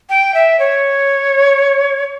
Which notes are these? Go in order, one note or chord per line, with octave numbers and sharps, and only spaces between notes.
G5
E5
C#5